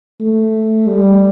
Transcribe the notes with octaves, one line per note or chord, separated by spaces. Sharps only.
A3
G3